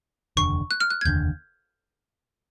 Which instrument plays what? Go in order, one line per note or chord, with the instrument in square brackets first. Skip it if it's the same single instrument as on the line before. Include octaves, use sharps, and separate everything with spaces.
[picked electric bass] F1 D#2 D3 [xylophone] C#6
[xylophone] F#6
F6
F#6
G#6
[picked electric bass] F1 D#2 D3 [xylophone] G6